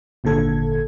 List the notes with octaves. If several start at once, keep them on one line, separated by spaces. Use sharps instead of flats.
G#1 A#2 D3 A4 G#6